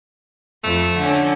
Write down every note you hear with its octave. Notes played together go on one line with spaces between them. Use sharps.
F2 A3
D3 C#4